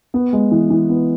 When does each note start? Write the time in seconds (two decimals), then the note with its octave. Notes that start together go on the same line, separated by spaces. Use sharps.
0.14 B3
0.33 G#3
0.51 E3
0.70 E3
0.89 B3